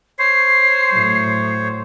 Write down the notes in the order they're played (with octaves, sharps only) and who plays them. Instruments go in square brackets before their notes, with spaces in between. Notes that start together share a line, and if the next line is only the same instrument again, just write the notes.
[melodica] C5 C#5 [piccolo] C7
[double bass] A2 F#3